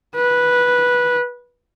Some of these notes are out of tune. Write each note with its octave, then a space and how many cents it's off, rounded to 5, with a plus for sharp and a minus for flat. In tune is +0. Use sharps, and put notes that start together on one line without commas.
B4 -10